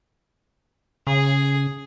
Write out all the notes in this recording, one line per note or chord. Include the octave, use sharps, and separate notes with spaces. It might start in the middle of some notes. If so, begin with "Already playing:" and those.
C#3 G#4